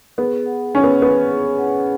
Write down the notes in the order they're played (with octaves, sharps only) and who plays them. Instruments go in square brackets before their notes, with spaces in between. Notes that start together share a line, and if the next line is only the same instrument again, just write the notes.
[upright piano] B3 [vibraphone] G#4
[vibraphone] F#5
[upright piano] C#4 [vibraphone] C#5
[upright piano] B3
[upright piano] B3 [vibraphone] C#4
[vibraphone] G#4
F#5